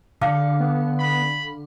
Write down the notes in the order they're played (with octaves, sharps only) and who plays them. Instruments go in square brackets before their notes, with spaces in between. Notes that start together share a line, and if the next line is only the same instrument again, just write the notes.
[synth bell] D3 [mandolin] F5
[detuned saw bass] B3
[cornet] B5